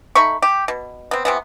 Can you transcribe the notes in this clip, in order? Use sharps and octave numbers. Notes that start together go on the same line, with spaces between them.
A3 D#4 B5 C#6
G4
B2
B3 C4
C3 E3 B3